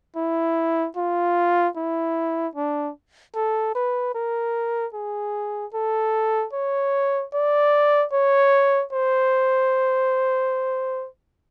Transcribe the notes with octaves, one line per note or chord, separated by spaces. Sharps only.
E4
F4
E4
D4
A4
B4
A#4
G#4
A4
C#5
D5
C#5
C5